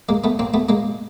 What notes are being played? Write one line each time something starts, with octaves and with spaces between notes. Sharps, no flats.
G#3 A#3
A3 B3
A#3 C4
A3 B3
G#3 A#3